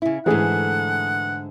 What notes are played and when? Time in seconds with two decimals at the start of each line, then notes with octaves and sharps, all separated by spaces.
0.02 C#3 E4
0.26 G#2 D3 E3 A3 G#4 F#5